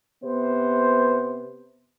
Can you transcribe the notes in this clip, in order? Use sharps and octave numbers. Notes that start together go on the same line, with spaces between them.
C3 B3 C5